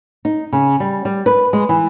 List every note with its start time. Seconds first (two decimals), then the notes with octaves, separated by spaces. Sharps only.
0.25 D#4
0.52 C#3
0.80 G3
1.05 G3
1.26 B4
1.53 G#3
1.69 E3